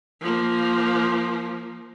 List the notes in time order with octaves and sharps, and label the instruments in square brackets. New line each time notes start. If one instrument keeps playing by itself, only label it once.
[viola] F3 A#3